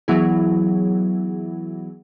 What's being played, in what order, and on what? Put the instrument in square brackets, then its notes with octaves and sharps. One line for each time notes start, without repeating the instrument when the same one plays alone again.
[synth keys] E3 F#3 B3 E4 G#4